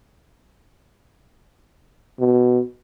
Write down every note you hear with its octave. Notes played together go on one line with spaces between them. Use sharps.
B2